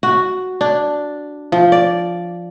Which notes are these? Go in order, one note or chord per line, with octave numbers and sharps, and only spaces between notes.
F#4
D4
F3
D5